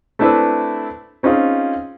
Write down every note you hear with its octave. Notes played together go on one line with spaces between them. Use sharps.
A3 C4 D4 E4 B4 E5
C4 C#4 D#4 F4 G#4